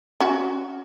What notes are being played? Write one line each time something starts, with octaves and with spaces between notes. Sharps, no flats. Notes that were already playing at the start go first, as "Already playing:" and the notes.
C#4 F#4